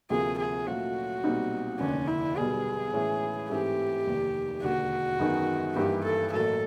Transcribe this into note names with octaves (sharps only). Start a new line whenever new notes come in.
D2 C3 F3 A#3 G#4
G#4
A#2 F#3 A3 C#4 F4 F#4
B1 A#2 G3 C4 D#4
F1 D#2 D3 C#4
E4
B1 B2 G3 B3 G#4
A2 E3 G#3 C#4
G#2 E3 A3 C4 G4
F1 D#2 D#3
E1 D#2 D3 F#4
F#2 D#3 G#3 B3 D#4
G2 E3 G3 A#3 D#4 G4
A4
A1 A2 F#3 A#3 A4